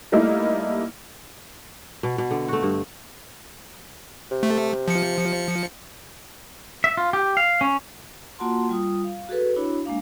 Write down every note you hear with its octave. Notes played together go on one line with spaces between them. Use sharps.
G3 A3 A#3 D#4 E4
B2
B2
D3
A3 F#4
G2
C3
A3
F3 C#7
E5
F4
G4
F5
C#4
A#3 F4 F#4 F#5 A5 C6
G3 F4 D#6
F5
F#4 G#4 A4 B4
D4 E4 F#4 C#5 B5
G#3 A#3 D4 F5